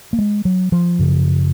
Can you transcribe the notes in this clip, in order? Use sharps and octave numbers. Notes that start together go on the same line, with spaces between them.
A#3
G#3
F#3
F3
F#2 C#3